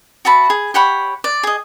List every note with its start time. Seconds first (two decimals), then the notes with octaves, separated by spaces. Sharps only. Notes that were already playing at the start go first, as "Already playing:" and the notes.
0.25 F#4 E5 A5 B5
0.50 G#4
0.74 G4 C#5 F#5 B5
1.24 D5
1.43 G#4 D#5